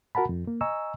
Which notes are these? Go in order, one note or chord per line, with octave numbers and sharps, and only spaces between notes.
F#4 A#4 F#5 A5 B5
F2
A#3
D#5 G#5 A#5 C#6 E6